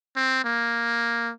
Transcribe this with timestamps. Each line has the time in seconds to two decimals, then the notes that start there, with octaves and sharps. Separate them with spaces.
0.16 C4
0.45 A#3